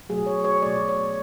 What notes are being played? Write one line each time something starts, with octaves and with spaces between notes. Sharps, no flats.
B2 F#3 A3 G#4
C#5
C#5
B2 F#3 A3 D5
C#5